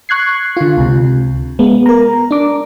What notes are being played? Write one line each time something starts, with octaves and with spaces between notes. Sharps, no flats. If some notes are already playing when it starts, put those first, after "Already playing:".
C#6 F#6 G#6 C7
D3 F4
C#2 C3
G#3 B3
A#4 A#5
D4 D6